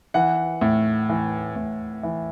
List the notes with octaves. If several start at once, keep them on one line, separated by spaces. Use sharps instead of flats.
E3 F#5
A2
E3
A2
E3